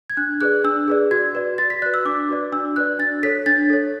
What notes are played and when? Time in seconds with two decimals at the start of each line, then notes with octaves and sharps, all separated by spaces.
0.10 G#6
0.17 D4 F#6
0.41 G#4 B4 D5 F#6
0.64 D4 E6
0.88 G#4 B4 D5
1.11 F#4 G#6
1.35 B4 D5
1.58 F#4 A6
1.70 B6
1.82 D5 F#6
1.86 B4
1.94 E6
2.05 D4 D6
2.29 F#4 B4 D5
2.52 D4 E6
2.76 F#4 B4 D5 F#6
2.99 D4 A6
3.23 A4 C#5 B6
3.46 D4 A6
3.70 A4 C#5